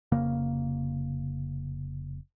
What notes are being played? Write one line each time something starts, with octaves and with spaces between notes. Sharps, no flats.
F1 C#3 A#3